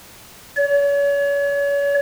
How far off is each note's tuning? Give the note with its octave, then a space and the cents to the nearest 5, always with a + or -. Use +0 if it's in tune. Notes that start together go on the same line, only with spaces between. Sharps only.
C#5 +40